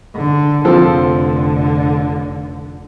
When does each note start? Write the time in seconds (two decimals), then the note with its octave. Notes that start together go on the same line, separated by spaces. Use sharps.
0.15 D3
0.65 F1 D3 F3 C4 A4